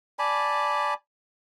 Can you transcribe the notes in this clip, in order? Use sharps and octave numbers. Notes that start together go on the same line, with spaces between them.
D5 G#5 A5 B5